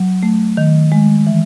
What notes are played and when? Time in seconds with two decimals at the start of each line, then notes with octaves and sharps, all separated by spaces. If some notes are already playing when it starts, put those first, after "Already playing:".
Already playing: F#3
0.23 A3
0.57 D#3
0.92 G#3
1.27 E3